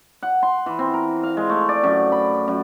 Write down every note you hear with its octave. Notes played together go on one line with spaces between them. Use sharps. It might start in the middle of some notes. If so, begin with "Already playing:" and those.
F#5
C6
E3
C4
A#4
F5
G#3
A3
D5
F#2
B5
F#2